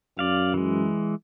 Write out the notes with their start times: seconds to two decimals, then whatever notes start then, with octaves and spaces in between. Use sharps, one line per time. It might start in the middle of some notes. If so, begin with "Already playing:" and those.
0.19 F#2 D5 F5
0.54 E3 G#3